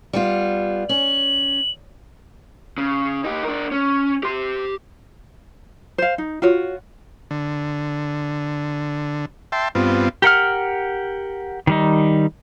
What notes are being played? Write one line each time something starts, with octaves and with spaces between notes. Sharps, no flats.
G3 B3 F4
C#4 F#7
C#3
D#4 G4
D4 A#4
C#4
G4 C6
C5 F5
D#4
F4 F#4 C#5
D3
E5 G5 A5 C6
G2 B3 C4 F4
G4 A#4 F#5 F6
D#3 G3 D#4